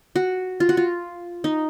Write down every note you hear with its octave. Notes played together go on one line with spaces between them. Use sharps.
F#4
F4
F#4
F4
D#4